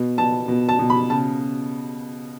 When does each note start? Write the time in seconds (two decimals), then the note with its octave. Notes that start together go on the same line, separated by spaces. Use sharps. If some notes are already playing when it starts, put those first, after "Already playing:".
Already playing: B2
0.18 B2 A5
0.48 B2
0.69 A5
0.79 B2
0.90 B5
1.10 C#3 A5